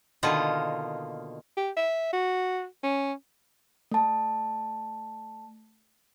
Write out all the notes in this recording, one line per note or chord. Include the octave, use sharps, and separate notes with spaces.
B2 D3 D#3 A#3 F4 D#5
G4
E5
F#4
C#4
A3 A5